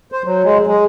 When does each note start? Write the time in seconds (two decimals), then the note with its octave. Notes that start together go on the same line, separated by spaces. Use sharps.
0.12 C5
0.24 F#3
0.44 G#3
0.67 G#3